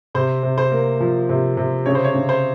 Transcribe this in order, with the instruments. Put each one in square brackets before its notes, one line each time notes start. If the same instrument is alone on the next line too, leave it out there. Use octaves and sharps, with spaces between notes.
[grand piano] C3 C5
C3
C5
A#3
F3
C3
C3
C#3 C#5
C5
C#5
C#3
C5